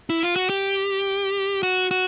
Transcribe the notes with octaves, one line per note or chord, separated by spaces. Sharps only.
E4
F4
F#4
G4
F#4
F#4